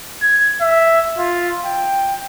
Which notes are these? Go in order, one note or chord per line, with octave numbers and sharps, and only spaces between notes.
G#6
E5
F4
G5